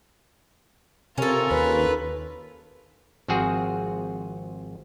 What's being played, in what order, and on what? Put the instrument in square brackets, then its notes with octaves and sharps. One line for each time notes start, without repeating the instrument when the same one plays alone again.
[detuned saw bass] C3 [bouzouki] C#4 A4 [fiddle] F4 A#4
[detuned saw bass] D#2 [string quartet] B4
[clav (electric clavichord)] G#1 F3 C4 F#4 G#4